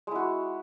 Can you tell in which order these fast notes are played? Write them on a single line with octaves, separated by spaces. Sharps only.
G#3 E4 F#4